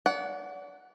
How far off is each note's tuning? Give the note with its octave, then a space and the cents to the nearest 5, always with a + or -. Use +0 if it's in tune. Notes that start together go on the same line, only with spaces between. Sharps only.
D5 -40 F#5 +0